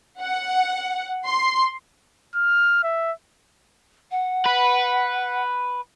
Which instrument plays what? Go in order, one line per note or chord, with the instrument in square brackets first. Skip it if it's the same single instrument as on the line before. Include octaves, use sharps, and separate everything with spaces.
[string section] F#5
C6
[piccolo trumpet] F6
E5
[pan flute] F#5
[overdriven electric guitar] B4